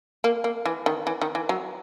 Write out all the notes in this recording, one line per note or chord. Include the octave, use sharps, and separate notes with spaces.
A#3
A#3
E3
D#3
E3
D#3
E3
F#3